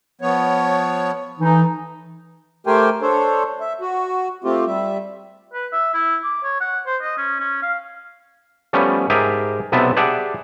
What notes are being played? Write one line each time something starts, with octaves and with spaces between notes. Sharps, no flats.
F3 B3 C#5
E3 A3 D#4
A3 G4 A#4 C5 G5 G#5
D4 A4 C5 C#5
E5
F#4
A3 C4 F4 G4
G3 E5
B4
E5
E4
D6
C#5
F#5
C5
D#5
C#4
C#4
F5
F3 G3 A3 B3 C#4
G#2 G4 G#4 A#4 E5 A5
B1 C3 B3 C4 E5 A5
G4 G#4 D5 E5 F#5 A5